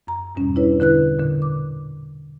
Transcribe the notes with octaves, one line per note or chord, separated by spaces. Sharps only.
F#2 A#5
E2 G2 B2 G3 C#4
D4 E4 B4 C#5
D3 E4 B4 F#6
A#2 D3
D6